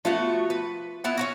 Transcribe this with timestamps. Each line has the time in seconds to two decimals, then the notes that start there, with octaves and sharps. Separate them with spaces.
0.05 F3 A3 B3 F4 F#4
0.50 B4
1.04 B3 E4 F#5
1.17 C#4 E4 F#4